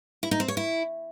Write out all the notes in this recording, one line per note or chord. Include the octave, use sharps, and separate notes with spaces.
E4
D#4
C4
C#5
E4